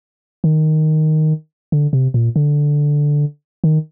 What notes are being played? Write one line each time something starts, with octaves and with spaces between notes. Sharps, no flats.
D#3
D3
C3
A#2
D3
D#3